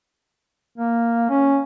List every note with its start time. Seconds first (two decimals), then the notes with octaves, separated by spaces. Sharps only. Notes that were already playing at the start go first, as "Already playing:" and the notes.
0.78 A#3
1.29 C#4